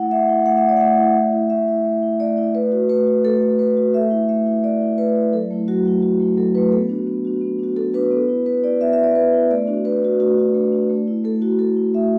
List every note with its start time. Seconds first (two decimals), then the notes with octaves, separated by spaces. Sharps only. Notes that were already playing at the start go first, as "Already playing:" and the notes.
Already playing: A3 E4 F#5
0.11 A3 E5
0.29 E4
0.46 A3 F#5
0.57 E5
0.63 E4
0.69 D5
0.77 F#5
0.81 A3 E5
0.97 E4
1.16 A3
1.33 E4
1.50 A3 E5
1.68 E4
1.85 A3
2.03 E4
2.20 A3 D5
2.38 E4
2.54 A3 B4
2.72 F#4
2.89 A3 B4
3.07 F#4
3.24 A3 A4
3.42 F#4
3.59 A3 B4
3.77 F#4
3.94 A3 E5
4.11 E4
4.29 A3 E5
4.46 E4
4.63 A3 D5
4.81 E4
4.98 A3 B4
5.15 E4
5.32 F#3 A4
5.51 A3 E4
5.68 F#3 F#4
5.85 A3 E4
6.02 F#3 F#4
6.20 A3 E4
6.37 F#3 A4
6.55 A3 E4 B4
6.72 B3 A4
6.89 D4 F#4
7.07 B3
7.24 D4 F#4
7.41 B3
7.59 D4 F#4
7.76 B3 A4
7.93 D4 F#4 B4
8.11 B3
8.29 E4
8.46 B3 B4
8.63 E4 D5
8.80 B3 E5
8.93 E4 E5
9.04 D5
9.15 B3 B4
9.33 E4
9.50 A3 D5
9.67 D4 F#4
9.85 A3 B4
10.02 D4 F#4
10.20 A3 F#4
10.37 D4 F#4
10.54 A3
10.72 D4 F#4
10.90 A3
11.07 E4
11.24 A3 A4
11.42 E4 F#4
11.59 A3 A4
11.77 E4
11.94 A3 E5